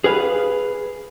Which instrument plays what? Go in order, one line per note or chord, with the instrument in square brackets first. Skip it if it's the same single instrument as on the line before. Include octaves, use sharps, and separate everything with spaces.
[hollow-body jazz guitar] G#4 B4 F5